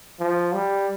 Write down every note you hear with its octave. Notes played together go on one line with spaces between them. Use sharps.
F3
G3